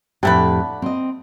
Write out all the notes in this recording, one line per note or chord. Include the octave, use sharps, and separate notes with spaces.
F2 A2 D3 A3 G4 B4
C4 D#5